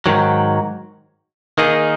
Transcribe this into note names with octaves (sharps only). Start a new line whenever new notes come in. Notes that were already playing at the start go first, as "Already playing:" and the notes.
G#2 D#3 F#3
D#3 A#3 D#4 G#4